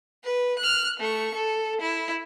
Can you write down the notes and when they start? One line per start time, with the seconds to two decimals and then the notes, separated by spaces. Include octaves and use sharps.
0.24 B4
0.59 F6 F#6
0.99 A3 C#6
1.35 A4
1.81 E4